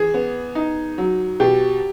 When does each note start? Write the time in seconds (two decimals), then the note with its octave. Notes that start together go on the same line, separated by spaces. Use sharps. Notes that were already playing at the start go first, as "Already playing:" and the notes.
Already playing: E3 G#4
0.14 B3
0.55 D#4
0.98 F#3
1.40 B2 G4